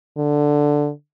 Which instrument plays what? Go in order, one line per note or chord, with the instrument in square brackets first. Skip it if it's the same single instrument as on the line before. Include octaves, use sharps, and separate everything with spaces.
[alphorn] D3